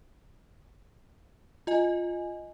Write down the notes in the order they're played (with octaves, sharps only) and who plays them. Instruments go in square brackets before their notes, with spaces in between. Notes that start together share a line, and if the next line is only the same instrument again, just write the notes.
[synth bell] F4 D#5 G#5